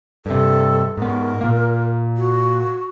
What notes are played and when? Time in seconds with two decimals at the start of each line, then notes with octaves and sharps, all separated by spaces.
0.26 G2 C3 A4
0.97 G#2 B3 A#4
1.41 A#2 A#3
2.17 F#4